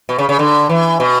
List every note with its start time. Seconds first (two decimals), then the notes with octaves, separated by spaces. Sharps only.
0.09 B2
0.19 C#3
0.29 C#3
0.39 D3
0.69 E3
1.00 B2